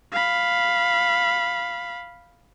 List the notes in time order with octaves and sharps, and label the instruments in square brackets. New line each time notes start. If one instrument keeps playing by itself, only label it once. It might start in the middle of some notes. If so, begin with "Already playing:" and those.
[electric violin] F5 B5